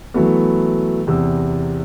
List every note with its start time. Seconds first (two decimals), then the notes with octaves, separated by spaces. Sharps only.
0.14 E3 F#3 A3 B3
1.07 E2 C3 E6